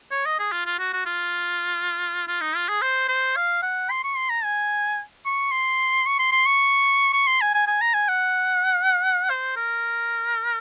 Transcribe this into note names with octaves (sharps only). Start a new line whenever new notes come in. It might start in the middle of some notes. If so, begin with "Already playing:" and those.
C#5
D#5
G#4
F4
F4
F#4
F#4
F4
F4
D#4
F4
G#4
C5
C5
F5
F#5
C6
C#6
C6
A#5
G#5
C#6
C6
C#6
C6
C6
C#6
C#6
C6
G#5
G#5
G#5
A#5
G#5
F#5
C5
A#4